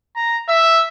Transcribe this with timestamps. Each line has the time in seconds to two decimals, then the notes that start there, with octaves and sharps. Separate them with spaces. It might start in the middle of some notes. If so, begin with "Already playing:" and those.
0.16 A#5
0.49 E5